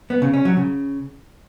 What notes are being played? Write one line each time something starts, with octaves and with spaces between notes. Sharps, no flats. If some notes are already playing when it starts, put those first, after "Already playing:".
B3
C#3
C#4
F#3
C#3